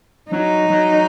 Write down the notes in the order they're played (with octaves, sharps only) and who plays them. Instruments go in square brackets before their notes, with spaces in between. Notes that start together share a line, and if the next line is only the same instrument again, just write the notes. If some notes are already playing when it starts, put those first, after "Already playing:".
[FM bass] F#3 [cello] D#4
[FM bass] F#3